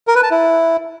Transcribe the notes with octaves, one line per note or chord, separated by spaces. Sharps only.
A#4
B4
A5
E4